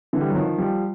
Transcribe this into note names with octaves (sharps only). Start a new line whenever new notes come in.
D3 E3
G3
F#3
D#3 F3
F3 G3